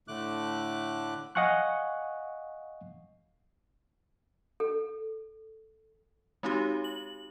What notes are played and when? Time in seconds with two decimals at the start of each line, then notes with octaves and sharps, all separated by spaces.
0.08 A2 D3 A3 D6 F#6
1.35 D#5 F5 F#5 G#5 C#6 F#6
4.60 A4
6.43 G#3 C4 D#4 F#4 G4
6.84 F#7